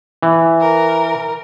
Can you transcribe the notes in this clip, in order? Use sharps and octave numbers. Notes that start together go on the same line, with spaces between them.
E3
A#4